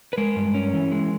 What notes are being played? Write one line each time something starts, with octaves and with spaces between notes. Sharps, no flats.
B4
G#3 A#4
G2
C#4
E3
G#3